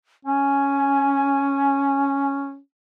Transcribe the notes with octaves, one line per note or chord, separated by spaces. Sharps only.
C#4 G#5